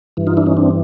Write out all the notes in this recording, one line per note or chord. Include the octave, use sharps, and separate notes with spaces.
G2 E3
D#4 F4
D4 E4
C#4 D#4
C4 D4